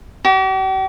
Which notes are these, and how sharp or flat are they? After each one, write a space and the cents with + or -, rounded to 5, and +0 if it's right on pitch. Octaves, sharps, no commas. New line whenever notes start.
G4 -45